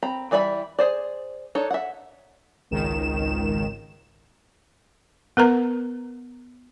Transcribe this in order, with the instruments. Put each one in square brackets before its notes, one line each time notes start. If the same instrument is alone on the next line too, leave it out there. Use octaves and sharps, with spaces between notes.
[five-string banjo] C4 A#5 B5
E3 G3 D5 E5 B5
G#4 C5 D5
D4 D#4 A4 C#5
E5 F#5
[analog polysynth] G#1 C#2 D#3 E7
[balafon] B3 A#4 B4 A#5